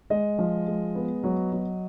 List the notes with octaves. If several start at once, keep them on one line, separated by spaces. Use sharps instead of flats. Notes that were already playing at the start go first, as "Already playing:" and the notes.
G#3 D#5
F3
G#3
B3
F#3
F#3